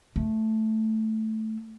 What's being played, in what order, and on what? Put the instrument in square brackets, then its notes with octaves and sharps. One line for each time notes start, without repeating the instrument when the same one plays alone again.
[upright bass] A3